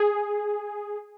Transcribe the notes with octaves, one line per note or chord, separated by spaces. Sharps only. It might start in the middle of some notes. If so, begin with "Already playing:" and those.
Already playing: G#4